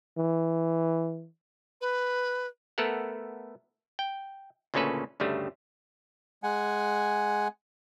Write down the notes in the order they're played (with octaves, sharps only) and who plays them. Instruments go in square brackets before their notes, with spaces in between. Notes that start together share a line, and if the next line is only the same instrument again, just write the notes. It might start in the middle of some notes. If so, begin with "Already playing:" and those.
[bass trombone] E3
[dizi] B4
[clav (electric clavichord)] A3 B3 A4 A#4 F#5
G5
D2 A#2 C#3 C#4 A4 B4
D2 G2 C#3 G3 A3
[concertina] G#3 F#5 G#5